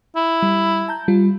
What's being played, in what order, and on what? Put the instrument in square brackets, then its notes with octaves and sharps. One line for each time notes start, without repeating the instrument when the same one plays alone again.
[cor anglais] E4
[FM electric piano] G3
A5 A#5 G6
G3 F4